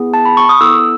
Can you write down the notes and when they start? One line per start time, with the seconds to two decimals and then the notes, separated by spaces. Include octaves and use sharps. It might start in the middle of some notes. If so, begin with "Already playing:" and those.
Already playing: B3 E4 G#4
0.14 A5
0.26 B5
0.37 C#6
0.49 D#6
0.61 B3 E4 A4 E6